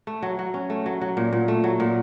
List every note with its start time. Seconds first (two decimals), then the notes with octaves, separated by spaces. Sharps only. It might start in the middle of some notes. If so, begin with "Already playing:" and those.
0.07 A3
0.23 F#3
0.39 F#3
0.54 C#4
0.70 A3
0.86 F#3
1.01 F#3
1.17 A#2
1.33 A#2
1.48 A3
1.64 F#3
1.80 A#2